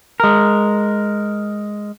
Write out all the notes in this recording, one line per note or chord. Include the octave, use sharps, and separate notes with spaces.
G#3 A#4